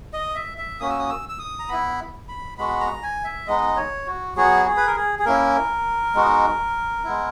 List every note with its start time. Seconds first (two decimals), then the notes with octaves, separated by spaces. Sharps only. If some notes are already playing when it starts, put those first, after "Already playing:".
0.13 D#5
0.35 E5
0.58 E5
0.80 A#3 C#4 F#4 D#6
0.89 E6
0.99 D#6
1.09 E6
1.29 E6
1.39 D#6
1.59 A#5
1.69 B3 E4 B5
2.29 B5
2.58 G#3 B3 F#4 B5
2.80 A#5
3.03 G#5
3.24 E5
3.47 G#3 B3 D#4 D#5
3.76 C#5
4.07 F#4
4.36 F#3 B3 F#4 G#4
4.66 G#4
4.77 B4
4.86 A#4
4.96 G#4
5.19 G#4
5.26 A#3 C#4 E4 A#4
6.15 G#3 B3 D#4 F#4
7.04 G#3 B3 E4